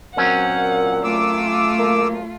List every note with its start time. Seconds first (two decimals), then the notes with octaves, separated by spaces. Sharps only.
0.17 A#2 F#3 C4 C#4 F#5
1.04 A3 F4 D6 E6
1.80 A#3